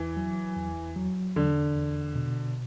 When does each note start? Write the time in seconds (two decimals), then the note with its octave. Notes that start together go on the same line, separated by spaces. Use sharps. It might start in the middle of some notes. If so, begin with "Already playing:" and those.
Already playing: E2 E3
0.17 F#3
0.57 E2
0.96 F#3
1.36 E2 D3
1.75 E2
2.15 B2